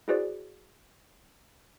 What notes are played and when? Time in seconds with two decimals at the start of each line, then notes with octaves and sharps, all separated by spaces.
0.08 E4 F#4 G#4 B4 C5 D5